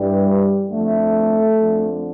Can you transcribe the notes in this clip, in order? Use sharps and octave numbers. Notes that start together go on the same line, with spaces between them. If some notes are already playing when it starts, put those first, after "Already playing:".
Already playing: G2 E3 G3
F2 D3 A3
F2 D3